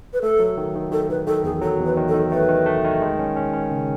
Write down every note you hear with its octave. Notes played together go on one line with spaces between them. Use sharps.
B4
A3 A4
F#3
D#3
D#3
D#3 A4
D#3 B4
D#3 A4
E2 G#4
F#3 A4
E2
B4
D#3
A4
D#3
A3 B4
D#3
A3
D#3
G#3
C#4
C#4
C#4
C#3